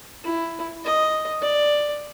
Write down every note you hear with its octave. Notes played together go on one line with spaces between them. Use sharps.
E4
D#5
D5